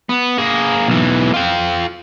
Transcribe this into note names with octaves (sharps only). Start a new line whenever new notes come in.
B3
A#3 G#4
B1 E3
F4 G5